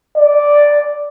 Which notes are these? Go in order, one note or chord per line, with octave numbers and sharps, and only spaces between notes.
D5